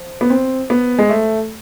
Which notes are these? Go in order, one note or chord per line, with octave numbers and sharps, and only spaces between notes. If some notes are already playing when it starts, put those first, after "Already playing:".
Already playing: F3
B3
C4
B3
G#3
A3